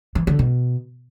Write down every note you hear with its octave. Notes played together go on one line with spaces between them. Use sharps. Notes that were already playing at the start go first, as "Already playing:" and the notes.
E3
D3
B2